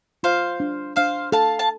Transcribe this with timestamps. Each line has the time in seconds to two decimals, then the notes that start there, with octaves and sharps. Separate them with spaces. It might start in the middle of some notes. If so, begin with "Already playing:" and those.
0.23 F4 C5 F5
0.60 D4
0.96 D4 C5 F5
1.32 A4 F5 A5
1.59 A5